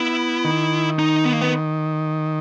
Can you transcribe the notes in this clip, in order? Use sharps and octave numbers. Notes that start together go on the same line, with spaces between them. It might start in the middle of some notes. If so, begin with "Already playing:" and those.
Already playing: B3 E4
D#3
D#4
B3
A#3
B3